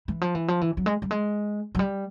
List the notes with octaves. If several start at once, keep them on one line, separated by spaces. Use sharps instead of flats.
E3
F3
E3
F3
E3
F#3
G#3
G3
G#3
F#3
G3